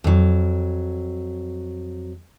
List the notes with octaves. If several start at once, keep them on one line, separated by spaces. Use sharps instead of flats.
F2 F#3